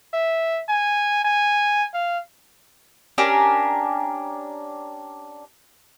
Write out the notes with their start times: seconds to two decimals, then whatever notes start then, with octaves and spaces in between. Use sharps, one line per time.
0.14 E5
0.69 G#5
1.25 G#5
1.94 F5
3.18 C#4 D4 G4 A#4